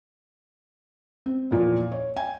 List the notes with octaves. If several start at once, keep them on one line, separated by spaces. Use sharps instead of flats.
C4
E2 A#2 F3
C#5
G5 G#5